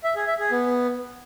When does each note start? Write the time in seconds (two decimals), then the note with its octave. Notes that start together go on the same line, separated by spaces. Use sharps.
0.04 E5
0.16 G#4
0.27 E5
0.39 G#4
0.51 B3